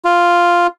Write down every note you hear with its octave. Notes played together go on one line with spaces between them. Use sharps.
F4